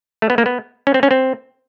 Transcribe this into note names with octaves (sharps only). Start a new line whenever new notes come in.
A3
B3
A#3
B3
C#4
C4
C#4
C4